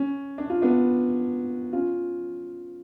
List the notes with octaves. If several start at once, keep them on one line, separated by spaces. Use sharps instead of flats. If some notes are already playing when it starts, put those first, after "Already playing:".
Already playing: C#4
D4
F4
B3 D4
C#4 F4